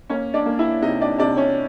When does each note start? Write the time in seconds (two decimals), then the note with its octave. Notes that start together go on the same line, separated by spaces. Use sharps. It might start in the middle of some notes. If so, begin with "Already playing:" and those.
0.10 A#3 C#4 C#5
0.34 D4 D5
0.46 A#3
0.59 E4 E5
0.82 C3 D#4 D#5
1.00 D4 D5
1.18 C3 D4 D5
1.36 C#4 C#5